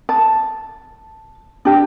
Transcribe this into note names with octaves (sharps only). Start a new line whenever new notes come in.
A5
D4 G4